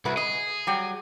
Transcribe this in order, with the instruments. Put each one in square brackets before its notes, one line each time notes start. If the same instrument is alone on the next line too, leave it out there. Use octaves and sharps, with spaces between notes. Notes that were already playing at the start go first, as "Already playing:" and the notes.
[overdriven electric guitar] C2 [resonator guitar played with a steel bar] E4 F#4 B4
[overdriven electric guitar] G#4 [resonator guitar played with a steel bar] D#5
[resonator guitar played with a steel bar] F#3 G3 G5